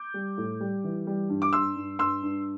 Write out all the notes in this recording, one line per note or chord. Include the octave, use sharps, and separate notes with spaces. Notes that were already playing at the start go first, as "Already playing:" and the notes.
Already playing: D6 G6
G3
A2
G3
E3
G3
G2
D6
G2 C6 E6
G2
G2 C6 E6
G2